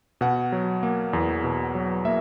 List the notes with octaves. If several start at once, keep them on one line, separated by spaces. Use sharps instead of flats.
B2 F#5
F#3
A#3
E2
B2
F#3
A#3 E5